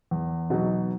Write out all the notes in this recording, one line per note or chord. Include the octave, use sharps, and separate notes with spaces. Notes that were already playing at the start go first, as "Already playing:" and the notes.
E2
B2 F#3 B3 D#4